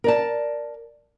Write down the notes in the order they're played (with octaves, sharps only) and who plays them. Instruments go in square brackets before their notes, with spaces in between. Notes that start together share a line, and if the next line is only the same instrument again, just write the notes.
[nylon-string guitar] A#4 D5 A5